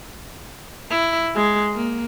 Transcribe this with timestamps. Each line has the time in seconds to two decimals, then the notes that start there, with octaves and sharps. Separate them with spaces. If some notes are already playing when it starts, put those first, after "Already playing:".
0.91 E4
1.35 G#3
1.74 A#3